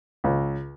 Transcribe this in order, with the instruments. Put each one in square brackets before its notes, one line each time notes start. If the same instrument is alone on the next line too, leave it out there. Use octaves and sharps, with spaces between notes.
[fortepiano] C#2